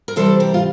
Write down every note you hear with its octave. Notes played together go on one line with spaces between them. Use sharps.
A#4
C3 E3 G3 A4 C5
G4 A#4
F4